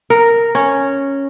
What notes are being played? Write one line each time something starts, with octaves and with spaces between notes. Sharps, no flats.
A#4
C#4